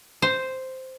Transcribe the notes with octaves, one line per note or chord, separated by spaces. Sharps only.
C5